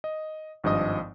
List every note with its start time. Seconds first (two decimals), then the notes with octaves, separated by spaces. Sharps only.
0.04 D#5
0.64 G#1 G2 F3 D#5 D#6